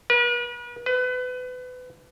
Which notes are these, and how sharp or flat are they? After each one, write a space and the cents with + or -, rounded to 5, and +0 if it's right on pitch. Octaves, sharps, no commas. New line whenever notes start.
B4 -40
B4 +30